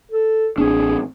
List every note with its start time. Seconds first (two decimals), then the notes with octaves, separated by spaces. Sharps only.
0.11 A4
0.58 A1 C4 D4 G#4